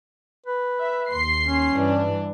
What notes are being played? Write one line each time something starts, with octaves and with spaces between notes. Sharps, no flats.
B4
E5
D#2 C6 C7
C#4
G2 E3 D4